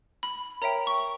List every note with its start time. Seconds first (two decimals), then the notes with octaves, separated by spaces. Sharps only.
0.23 B5
0.62 A#4 C#5 E5 G5 A#5
0.87 C#6